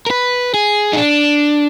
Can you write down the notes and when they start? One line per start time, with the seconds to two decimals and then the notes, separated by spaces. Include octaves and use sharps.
0.06 A#4
0.10 B4
0.54 G#4
0.93 D#4
0.97 D4